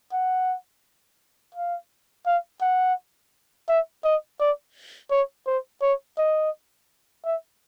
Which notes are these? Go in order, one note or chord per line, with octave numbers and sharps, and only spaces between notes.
F#5
F5
F5
F#5
E5
D#5
D5
C#5
C5
C#5
D#5
E5